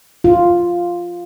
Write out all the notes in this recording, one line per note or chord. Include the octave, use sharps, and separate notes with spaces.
F4